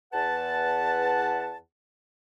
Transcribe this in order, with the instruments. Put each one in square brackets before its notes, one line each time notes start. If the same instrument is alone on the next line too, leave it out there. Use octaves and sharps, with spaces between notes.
[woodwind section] E2 B4 F#5 A5